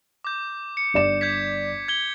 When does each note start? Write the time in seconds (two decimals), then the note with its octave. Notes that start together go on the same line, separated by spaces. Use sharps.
0.25 D6 G6
0.77 C#7
0.94 G1 D5 E7
1.21 G6 G#6 B6
1.88 G#6 G7